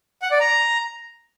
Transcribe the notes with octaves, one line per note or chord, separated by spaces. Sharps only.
F#5
D5
A#5